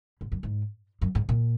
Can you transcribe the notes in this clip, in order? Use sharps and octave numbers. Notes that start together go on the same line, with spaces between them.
G#2
F#2
G#2
F#2
G#2
A#2